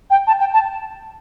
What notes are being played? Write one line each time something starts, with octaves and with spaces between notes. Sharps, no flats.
G5
A5
G5
A5